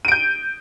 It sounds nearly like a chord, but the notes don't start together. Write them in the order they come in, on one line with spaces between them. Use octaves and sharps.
D#7 D7 G6